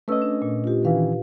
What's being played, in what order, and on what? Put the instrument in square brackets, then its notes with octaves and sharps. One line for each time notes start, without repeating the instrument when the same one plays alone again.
[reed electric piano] A3 C#4 D#5 [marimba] B4 E6
[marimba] D4
A#2
F4 G4
[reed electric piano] D#3 E3 C#4 [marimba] B4 F5